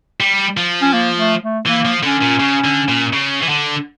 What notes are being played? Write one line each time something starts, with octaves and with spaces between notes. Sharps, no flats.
G3
F3
C#4
A#3
A3
A3
E3 A#3
F3
D3 C#4
A#2
C#3
D3
A#2
C#3
E3
D3